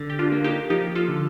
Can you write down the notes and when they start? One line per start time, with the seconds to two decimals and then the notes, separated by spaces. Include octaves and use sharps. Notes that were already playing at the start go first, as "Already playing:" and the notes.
Already playing: D3
0.10 G4
0.19 D4 F4
0.32 A#3
0.44 D#4 G4
0.70 F3 D#4 G4
0.95 F4 A4
1.08 D3